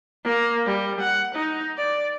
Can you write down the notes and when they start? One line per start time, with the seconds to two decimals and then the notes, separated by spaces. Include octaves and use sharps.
0.24 A#3
0.66 G3
1.00 F#5
1.35 D#4
1.77 D5